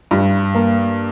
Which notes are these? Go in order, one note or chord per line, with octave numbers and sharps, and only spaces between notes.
G2
A#3